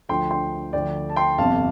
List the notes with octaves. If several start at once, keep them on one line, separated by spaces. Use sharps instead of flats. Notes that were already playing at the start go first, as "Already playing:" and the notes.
D2 D3 F3 G5 C6
G5 C6
D2 D3 F3 D5 G5
A5
G5 C6
G1 F2 C3 F5 A5